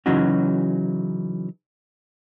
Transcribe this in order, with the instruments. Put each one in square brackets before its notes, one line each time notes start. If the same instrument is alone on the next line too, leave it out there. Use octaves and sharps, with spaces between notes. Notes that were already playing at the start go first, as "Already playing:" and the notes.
[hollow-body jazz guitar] C#3 E3 F#3 C#4 D#4 F#4